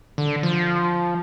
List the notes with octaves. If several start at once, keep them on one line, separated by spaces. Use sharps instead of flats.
D3
F3